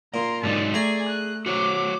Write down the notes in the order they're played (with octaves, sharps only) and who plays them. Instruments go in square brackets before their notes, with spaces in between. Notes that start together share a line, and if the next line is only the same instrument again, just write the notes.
[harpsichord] A#2 [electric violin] A#5 C6
[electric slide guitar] G#2 F#3 D#4 [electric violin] D5 A5
[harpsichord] A3 A#5 [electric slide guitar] G#4 [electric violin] D5 G#5
[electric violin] F#6
[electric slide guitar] F#4 C5 C#5 [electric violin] D6